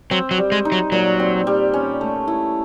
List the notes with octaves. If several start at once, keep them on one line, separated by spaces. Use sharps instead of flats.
F#3 C4
F#3
G3
G#3
D#4
F#3
A#2 F#3
C4
G3
C#4
A3
E4